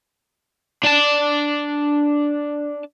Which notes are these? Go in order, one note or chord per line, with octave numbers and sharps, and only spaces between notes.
D4 A5